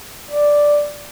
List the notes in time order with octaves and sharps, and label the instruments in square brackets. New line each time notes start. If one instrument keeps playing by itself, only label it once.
[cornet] D5